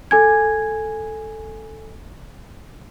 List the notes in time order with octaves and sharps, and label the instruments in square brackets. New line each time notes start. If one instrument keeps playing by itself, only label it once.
[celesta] A4 G#5 G#6